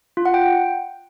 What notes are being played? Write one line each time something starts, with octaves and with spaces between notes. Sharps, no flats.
F4
F#5
G5